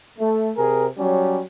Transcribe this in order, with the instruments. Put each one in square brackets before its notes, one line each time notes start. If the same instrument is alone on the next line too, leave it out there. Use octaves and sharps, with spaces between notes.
[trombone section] A3
C3 G#4 A#4
F#3 G3 C#4